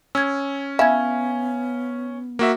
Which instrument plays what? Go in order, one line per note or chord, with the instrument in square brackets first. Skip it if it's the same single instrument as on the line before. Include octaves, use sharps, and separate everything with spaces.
[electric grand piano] C#4 [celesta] E6 G#6
[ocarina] B3 [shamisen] E4 [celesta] F5 G#5 G#6
[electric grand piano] A#3 F#4 E5